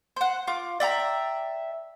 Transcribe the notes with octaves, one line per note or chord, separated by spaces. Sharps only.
C5 F#5
F4 D6
D5 E5 G5 A#5